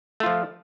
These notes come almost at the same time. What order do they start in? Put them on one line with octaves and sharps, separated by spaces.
A3 F4 F3